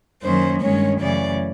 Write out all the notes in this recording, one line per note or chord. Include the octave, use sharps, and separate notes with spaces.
F#2 D#3 F#3 A#3 C#4 C5
G2 D#3 G#3 C#4 C#5
F#2 C#3 E3 A3 C#4 D5